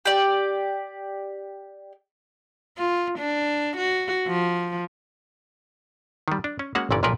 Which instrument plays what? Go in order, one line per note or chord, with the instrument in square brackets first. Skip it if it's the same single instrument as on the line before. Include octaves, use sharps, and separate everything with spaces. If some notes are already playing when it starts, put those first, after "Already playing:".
[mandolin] G4 D5
[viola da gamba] F4
D4
F#4
F3
[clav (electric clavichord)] D#3 G3
D4
C#4
G#3 A#3 C#4 F#4 F#5
G1 A#2 E3 C#4 D5
B1 A#2 F3 F4 A#4 B4